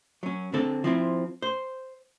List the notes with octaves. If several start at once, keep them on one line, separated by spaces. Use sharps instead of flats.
F#3 C#4
D3 C4 A4
F3 C4 E4
C5